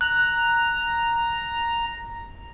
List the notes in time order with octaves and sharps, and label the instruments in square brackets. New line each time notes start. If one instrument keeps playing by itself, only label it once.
[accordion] A#5 [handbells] F#6